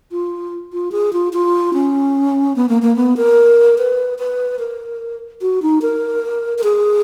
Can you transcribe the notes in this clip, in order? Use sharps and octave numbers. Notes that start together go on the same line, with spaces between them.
F4
F4
G#4
F4
F4
C#4
B3
A#3
A#3
B3
A#4
B4
B4
A#4
F#4
D#4
A#4
A#4
G#4